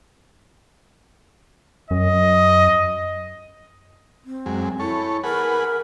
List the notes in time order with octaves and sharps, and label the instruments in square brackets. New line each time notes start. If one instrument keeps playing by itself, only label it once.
[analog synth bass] F#2 [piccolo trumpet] D#5
[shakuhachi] C4
[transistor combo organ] F#2 G#3
[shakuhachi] E4 [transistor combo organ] A4 C#5
[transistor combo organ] G#4 B4 F#5 [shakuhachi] A#4